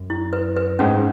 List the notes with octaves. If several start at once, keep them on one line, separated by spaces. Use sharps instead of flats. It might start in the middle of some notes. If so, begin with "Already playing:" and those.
Already playing: F#2
E4
B4
B4
G#2 C#4